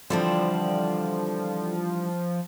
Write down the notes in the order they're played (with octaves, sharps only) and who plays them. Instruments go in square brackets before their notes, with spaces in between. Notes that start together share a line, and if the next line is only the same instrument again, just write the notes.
[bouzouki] D3 C4 E4 [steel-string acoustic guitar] E3 G3 D4 [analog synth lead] F3